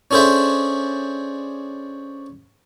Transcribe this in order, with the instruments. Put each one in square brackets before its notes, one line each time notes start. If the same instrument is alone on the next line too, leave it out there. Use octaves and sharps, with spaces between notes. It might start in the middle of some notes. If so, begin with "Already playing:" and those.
[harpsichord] C#4 D4 G#4 A4 C5 E5